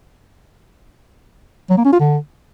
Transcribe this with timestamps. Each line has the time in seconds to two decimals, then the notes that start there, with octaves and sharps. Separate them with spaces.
1.70 F#3
1.77 A#3
1.85 C#4
1.92 F4
2.00 D3